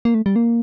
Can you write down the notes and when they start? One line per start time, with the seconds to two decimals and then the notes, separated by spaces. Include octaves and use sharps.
0.05 A#3
0.14 A3
0.26 G3
0.36 A#3